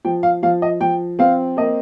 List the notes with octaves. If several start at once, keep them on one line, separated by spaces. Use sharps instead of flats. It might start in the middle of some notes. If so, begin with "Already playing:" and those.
F3 G5
F5
F3 F5
D#5
F3 G5
C4 F5
A#3 D#5